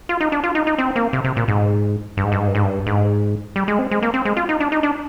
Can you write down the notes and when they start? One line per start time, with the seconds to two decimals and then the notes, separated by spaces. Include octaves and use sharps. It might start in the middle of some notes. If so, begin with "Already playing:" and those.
0.09 F4
0.21 D#4
0.32 D4
0.43 F4
0.55 D#4
0.67 D#4
0.78 C4
0.96 A#3
1.13 C3
1.24 C3
1.37 A#2
1.48 G#2
2.17 G2
2.25 G#2
2.32 G2
2.40 G#2
2.47 G2
2.55 G#2
2.63 G2
2.87 G#2
3.56 G3
3.68 G#3
3.79 C4
3.91 G#3
4.03 A#3
4.14 C4
4.25 G#3
4.37 F4
4.49 D#4
4.60 D4
4.72 D#4
4.83 D4